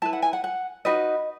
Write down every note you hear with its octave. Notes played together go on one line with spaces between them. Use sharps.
E4 B4 A5
F#5
G#5
F#5
F#5
D#4 F#4 B4 D#5